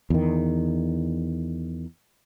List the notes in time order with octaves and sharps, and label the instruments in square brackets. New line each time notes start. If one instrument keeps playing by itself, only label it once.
[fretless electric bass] E2 D#3